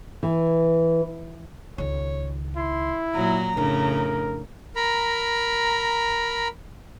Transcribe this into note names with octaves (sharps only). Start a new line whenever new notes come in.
E3
C#2 D#3 C#5
E4 C6
A#2 F#3 A#5
F2 A2 C#3 D4 A#4
A#4 A#5 B5